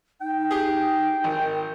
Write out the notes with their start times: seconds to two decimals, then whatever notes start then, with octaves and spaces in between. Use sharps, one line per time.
0.21 D#4 G5
0.51 G4 G#4
1.24 G#1 A#4